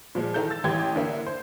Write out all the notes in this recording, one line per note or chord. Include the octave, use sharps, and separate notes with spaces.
A#2 F3 G#3
D#3 E3 D#4 A4 G6
E6 A6
A1 E3 G4 G#6
D3 A#3 E5
C5